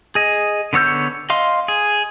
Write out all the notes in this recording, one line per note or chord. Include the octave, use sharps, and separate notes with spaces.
G#4 D#5
D3 B3 C#5 E6 G6
D#5 F5 C6
G#4